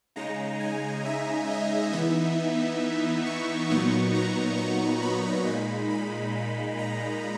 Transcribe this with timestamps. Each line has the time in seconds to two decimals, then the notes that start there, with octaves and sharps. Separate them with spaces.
0.16 C#3 G#3 D#4 A#5
0.60 G#5
1.05 E5
1.49 D#5
1.93 E3 B3 D#4 E5
3.26 C#6
3.70 A#2 F#3 B3 D#4 C#6
4.15 A#5
4.58 C#6
5.02 B5
5.46 A#2 G#3 D#4 B5
5.91 B5
6.79 A#5